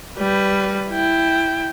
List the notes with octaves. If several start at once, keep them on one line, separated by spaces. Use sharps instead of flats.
G3 B4
E4 G5